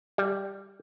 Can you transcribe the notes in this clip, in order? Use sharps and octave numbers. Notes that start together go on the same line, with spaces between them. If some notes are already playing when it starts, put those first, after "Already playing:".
G3